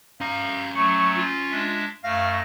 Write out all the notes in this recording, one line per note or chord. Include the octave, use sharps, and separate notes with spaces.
C#4 F5 A#5 G6
F#3 A3 C#6
F4
G#3 D4 E5
F#2 A3 F5 A#6